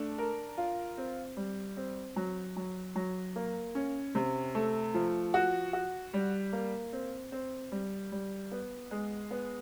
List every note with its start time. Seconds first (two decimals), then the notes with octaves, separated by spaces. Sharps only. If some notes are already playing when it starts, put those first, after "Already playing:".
Already playing: A3 D4
0.18 A#4
0.58 F4
0.98 C4
1.37 G3
1.77 C4
2.16 F#3
2.56 F#3
2.96 F#3
3.36 A#3
3.75 C#4
4.15 C3
4.55 A3
4.94 F3
5.34 F#4
5.73 F#4
6.14 G3
6.53 A#3
6.93 C4
7.32 C4
7.72 G3
8.12 G3
8.52 B3
8.91 G#3
9.31 B3